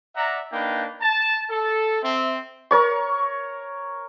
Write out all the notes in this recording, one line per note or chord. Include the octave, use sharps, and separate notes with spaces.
D5 E5 F#5 A#5
A#3 D4 D#4 B4 G5
A5
A4
C4 E5
A#4 C#5 C#6